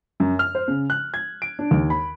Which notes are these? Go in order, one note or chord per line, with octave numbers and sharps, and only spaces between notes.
F#2
F6
C5
C#3
F#6
G#6
D7
D4
D#2
B5